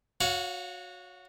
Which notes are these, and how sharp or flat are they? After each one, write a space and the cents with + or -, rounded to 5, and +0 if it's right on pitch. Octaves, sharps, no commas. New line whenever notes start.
F#4 -20 C#5 +10 F5 +10